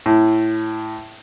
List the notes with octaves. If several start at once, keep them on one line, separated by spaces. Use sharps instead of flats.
A2